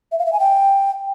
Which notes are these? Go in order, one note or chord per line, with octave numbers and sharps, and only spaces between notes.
E5
F5
E5
G#5
G5